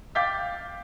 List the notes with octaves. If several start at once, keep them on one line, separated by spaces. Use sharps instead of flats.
F5 G5 D6 G6 A6 B6